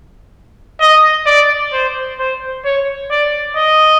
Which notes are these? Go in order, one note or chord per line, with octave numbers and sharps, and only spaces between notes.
D#5
D5
C5
C5
C#5
D5
D#5